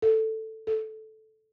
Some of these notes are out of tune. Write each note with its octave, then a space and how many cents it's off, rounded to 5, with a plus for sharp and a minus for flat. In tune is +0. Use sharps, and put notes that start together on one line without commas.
A4 +5
A4 -10